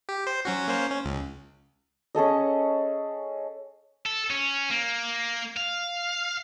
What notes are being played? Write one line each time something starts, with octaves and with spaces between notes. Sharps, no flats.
G4
C5
F#3 C#4 F#4
A#3 C#4 C5
C#4
C#2
C#4 G#4 A4 D#5
A4
C#4
A#3
F5